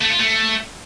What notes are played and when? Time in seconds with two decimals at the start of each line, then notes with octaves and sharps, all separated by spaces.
0.01 A3
0.11 F4
0.20 A3